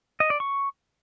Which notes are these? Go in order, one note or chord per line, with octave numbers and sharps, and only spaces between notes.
D#5
D5
C#6